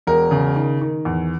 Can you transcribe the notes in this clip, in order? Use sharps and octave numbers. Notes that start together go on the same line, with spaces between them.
E1 A#4
C#3
D#3
D#3
E2